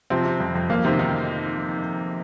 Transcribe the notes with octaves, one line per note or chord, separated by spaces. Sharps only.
C3 F3 C4
C3
F2
F2
F2 A#3
C3 D#3 C4
D#3 D#4